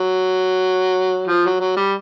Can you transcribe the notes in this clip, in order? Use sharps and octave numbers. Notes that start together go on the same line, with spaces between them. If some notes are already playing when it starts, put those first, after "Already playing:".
Already playing: F#3
F3
F#3
F#3
G3